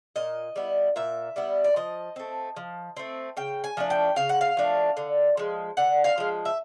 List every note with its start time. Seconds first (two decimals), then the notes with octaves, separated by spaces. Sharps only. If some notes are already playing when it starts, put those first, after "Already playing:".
0.16 A#2 D#5
0.56 G3 B3 E4
0.96 A#2 E5
1.36 G3 B3 E4
1.64 D5
1.76 F3 D#5
2.16 A3 C4
2.56 F3
2.97 A3 C4
3.37 C#3 G5
3.64 G#5
3.77 F3 A3 D4
3.90 G5
4.16 C#3 F5
4.29 F#5
4.41 F5
4.57 F3 A3 D4
4.97 D3
5.37 F3 G#3
5.77 D3 F#5
6.04 F5
6.18 F3 G#3
6.45 E5